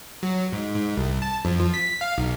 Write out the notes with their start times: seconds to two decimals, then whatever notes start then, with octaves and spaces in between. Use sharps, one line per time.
0.23 F#3
0.52 G#2
0.75 G#2
0.97 C2
1.22 A5
1.45 F2
1.60 F3
1.74 B6
2.01 F5
2.18 B1